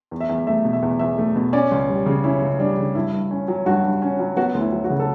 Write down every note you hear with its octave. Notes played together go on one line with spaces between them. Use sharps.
E2
E5
E2
A3 E5
B2
E5
E2
E2 E5
A3
B2
C#4 D5
C#2
G3
C#3
C#4 E4
C#2
G3 D4
C#3
G2 E4
G2
C#4
F#3
G2 F#4
G2
C#4
F#3
B3 F#4
D2
E4
F#3
F#4
C#3
A4